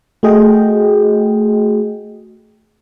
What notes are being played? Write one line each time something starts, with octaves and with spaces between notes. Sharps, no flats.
A3 F#4 G#4 D#5 G5